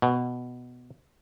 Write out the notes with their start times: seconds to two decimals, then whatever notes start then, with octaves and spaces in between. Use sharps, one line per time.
0.02 B2